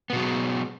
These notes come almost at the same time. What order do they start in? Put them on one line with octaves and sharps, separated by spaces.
B3 B2 F#3 G#3